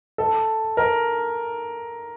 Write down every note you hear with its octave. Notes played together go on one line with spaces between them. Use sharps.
A4
A#4